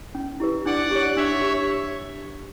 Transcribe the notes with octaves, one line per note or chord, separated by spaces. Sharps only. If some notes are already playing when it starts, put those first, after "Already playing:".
C#4
E4 G4 B4
D4 D5 F#5
G4 C#5
D4 C#5 E5
G4